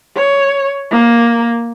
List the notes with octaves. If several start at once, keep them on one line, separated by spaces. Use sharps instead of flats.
C#5
A#3